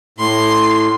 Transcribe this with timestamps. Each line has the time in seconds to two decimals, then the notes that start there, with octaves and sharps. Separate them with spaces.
0.18 A2 C6